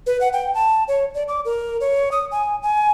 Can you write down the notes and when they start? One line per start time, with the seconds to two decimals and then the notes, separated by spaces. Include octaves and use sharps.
0.07 B4
0.21 F#5
0.33 G5
0.54 A5
0.88 C#5
1.15 D5
1.28 D6
1.45 A#4
1.81 C#5
2.12 D#6
2.32 G#5
2.63 G#5